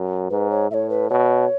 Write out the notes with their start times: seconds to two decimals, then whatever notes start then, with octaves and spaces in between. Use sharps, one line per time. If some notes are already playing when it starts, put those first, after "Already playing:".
Already playing: F#2
0.30 G#2 B4
0.50 C#5
0.71 A2 E5
0.74 C#5
0.90 B4
1.09 B2 C#5